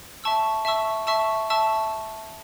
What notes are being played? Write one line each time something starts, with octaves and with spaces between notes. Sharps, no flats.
E5 A5 C#6 E6
E5 A5 C#6 E6
E5 A5 C#6 E6
E5 A5 C#6 E6